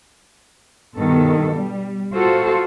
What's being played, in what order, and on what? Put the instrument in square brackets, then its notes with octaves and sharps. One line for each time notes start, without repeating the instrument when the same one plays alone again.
[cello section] G2 B2 D#3 B3 A4
G3
F4 F#4 A4 C5